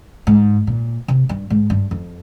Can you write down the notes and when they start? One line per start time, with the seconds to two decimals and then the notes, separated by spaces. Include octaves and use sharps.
0.27 G#2
0.67 A#2
1.08 C3
1.29 G2
1.50 G#2
1.70 G2
1.91 F2